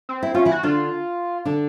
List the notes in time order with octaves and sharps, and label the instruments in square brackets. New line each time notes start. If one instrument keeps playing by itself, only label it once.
[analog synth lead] C4
[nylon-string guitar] E4
[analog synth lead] C#4 [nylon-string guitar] F4
[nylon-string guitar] E3 E4
[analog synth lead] F#4
[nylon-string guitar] D3 D4 [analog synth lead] F4
[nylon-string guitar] D3 D4